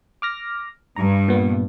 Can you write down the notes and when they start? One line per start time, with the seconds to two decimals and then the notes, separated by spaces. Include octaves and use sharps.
0.22 D6 F6 A#6
0.96 G2 A#5
1.28 A#2 B3